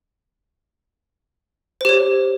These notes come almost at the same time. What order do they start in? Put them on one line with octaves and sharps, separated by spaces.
C5 G4 C#5